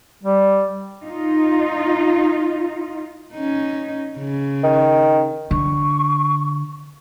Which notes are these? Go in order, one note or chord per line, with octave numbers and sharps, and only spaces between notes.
G3
D#4 F4
C#4 D#4
C#3
D#3
D3 C#6